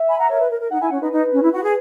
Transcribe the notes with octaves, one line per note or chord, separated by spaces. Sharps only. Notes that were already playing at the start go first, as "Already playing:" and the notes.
Already playing: E5
G#5 B5
F#5 A#5
A#4 C#5
B4
A#4
A#4
D#4 F#5
E4 G#5
C#4 F#5
D#4 B4
D#4
C#4
E4
F#4
G#4